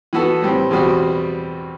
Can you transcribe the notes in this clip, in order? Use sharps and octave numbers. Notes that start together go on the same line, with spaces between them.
E3 B3 F#4 A4
A2 G3 C4
E2 B2 G3 C4 F#4